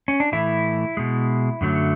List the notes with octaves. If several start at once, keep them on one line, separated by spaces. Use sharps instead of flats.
C#4
D4
A2 E3 A3 E4
B2 G#3
F#2 D3 F#3 A3